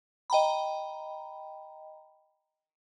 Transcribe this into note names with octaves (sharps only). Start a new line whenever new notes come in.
D#5 G5 A#5 B5